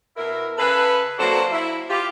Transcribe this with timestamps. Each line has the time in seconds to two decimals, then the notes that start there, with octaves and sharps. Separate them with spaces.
0.16 B2 E4 A#4
0.58 C#3 G#4 A4 B4
1.19 F#3 A#3 D4 F#4 A4 C5
1.52 E4
1.89 F4 G4